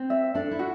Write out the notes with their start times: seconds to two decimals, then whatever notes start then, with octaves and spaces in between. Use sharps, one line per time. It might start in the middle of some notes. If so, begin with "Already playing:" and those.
Already playing: C4
0.10 E5
0.34 D4 A4
0.51 E4
0.59 F#4